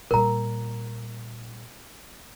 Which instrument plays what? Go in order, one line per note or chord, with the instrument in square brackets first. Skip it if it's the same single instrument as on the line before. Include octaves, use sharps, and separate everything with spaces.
[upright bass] A#2 G3 [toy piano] A#4 A#5